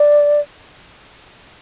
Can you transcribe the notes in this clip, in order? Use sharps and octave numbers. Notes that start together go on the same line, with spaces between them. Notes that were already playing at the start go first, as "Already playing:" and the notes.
Already playing: D5